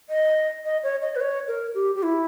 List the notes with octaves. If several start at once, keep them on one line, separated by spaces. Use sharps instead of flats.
D#5
D#5
C#5
D#5
B4
C#5
A#4
G4
G4
E4